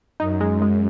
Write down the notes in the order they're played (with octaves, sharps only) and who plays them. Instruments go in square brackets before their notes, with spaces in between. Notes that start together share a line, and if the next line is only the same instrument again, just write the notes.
[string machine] F#2 [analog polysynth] D#4
[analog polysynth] G#3
G#3